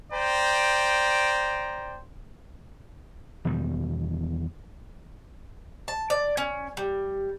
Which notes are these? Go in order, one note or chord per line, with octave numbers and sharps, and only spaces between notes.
C5 D5 G5 A#5
E2 B2 D#3 G3
A5
D5
C#4
G3